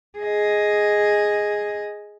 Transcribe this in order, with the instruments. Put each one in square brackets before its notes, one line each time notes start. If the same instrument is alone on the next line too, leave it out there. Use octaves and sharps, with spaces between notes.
[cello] G#4 D#5